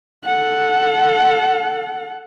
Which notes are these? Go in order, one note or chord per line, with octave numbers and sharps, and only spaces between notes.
A4 F#5